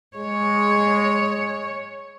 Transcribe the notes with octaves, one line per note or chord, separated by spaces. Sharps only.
G#3 C#5